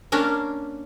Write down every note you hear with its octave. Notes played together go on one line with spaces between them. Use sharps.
A#3 C#4 D4 A#4